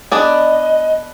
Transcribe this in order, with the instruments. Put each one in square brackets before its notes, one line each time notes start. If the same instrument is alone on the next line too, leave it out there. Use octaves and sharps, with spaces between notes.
[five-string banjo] B3 D4 G#4 D5 [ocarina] D#5